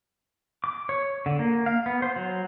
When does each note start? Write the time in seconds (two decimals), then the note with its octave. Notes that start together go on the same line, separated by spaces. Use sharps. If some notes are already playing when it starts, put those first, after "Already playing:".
0.64 D6
0.89 C#5
1.26 D3
1.39 A#3
1.66 F5
1.86 B3
2.02 C5
2.16 F#3